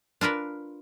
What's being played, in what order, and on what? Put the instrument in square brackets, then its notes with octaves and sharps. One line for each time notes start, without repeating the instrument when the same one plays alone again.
[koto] D4 F4 A#4 B4